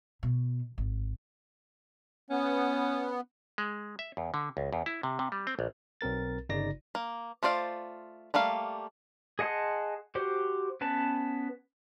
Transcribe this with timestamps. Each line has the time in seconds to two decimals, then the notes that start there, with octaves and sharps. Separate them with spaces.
0.23 B2
0.78 G#1
2.30 B3 C#4
3.58 G#3
3.99 E5
4.17 E2
4.34 D3
4.57 C#2
4.73 E2
4.86 E4
5.03 C3
5.19 C3
5.32 G3
5.47 C4
5.59 A#1
6.01 B1 C4 A#4 A6
6.49 G1 C#3 D#4 D5 A#6
6.95 A#3
7.43 A3 F4 C5 D5 F5
8.34 G3 A3 A#3 F5
9.39 G#4 D#5 F#5 A5 C6
10.15 F#4 G4 C5
10.81 B3 C#4 B4 A5